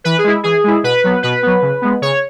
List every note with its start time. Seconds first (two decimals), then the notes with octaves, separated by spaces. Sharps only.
0.04 E3 B4
0.18 G#4
0.24 G#3 E4
0.43 E3 G#4
0.64 G#3 E4
0.83 B2 B4
1.04 F#3 B3
1.23 B2 B4
1.43 F#3 B3
1.62 C#3
1.82 G#3 B3
2.01 C#3 C#5